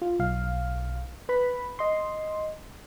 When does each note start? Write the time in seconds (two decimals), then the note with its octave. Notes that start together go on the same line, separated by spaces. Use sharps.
0.02 F4
0.20 B1 F5
1.29 B4 B5
1.79 D#5 C6